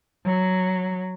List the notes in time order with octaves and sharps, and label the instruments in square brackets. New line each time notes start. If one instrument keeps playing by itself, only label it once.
[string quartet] F#3